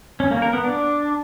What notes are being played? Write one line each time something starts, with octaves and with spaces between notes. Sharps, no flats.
C#4
A#3
A#4
B3
D4